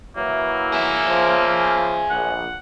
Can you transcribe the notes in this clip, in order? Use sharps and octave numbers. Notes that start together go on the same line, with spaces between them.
E3 F#3 A#3 E4
G#4 E5
C#3 F3
A#1 F#5